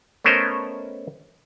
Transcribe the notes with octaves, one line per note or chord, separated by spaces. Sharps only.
A3 B3 C#4 A#4 C5 D#5